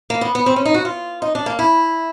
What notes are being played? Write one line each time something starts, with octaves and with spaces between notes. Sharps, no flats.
A#3
B3
B3
C4
C#4
D#4
F#4
F4
D#4
D4
A#3
E4